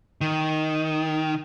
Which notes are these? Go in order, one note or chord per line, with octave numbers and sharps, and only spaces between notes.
D#3